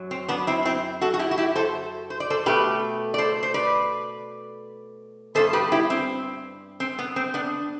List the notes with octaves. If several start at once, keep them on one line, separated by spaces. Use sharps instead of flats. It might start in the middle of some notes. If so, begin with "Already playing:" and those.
Already playing: F#2 F#3
C4
B3 D4
C4 E4
C4 E4
F#4 A4
F#4
E4 G4
F#4
E4 G4
A4 C5
C5
D5
A4 C5
B2 A3 G4 B4
D5
A4 C5
C5
B4 D5
G2 E3 B3 A4 C5
G4 B4
E4 G4
C4
C4
B3
C4
B3 D4